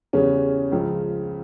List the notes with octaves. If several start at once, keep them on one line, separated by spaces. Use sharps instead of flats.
E2 C#3 G3 C#4
C#2 C#3 F3